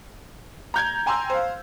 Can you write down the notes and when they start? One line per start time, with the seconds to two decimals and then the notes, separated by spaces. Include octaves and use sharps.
0.74 A#5 G6 G#6
1.06 G5 G#5 A#5 C6 E6
1.30 C5 F5